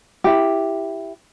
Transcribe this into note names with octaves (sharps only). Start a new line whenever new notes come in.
E4 G4